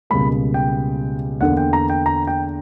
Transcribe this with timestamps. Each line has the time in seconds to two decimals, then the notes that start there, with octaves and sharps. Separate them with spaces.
0.10 C#2 B2 G3 A#3 B5
0.54 G5
1.41 E2 D3 A#3 F#5
1.57 G5
1.73 A#5
1.90 G5
2.06 A#5
2.27 G5